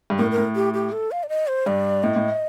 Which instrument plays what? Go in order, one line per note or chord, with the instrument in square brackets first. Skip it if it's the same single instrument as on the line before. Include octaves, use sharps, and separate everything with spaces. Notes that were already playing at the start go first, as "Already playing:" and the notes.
[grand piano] G2
[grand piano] A2 [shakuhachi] A#4
[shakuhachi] A#4
[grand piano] A2
[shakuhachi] G4
G4
A4
F5
D5
D#5
C5
[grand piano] G2 [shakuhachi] D5
[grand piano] A2 [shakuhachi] D#5
[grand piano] A2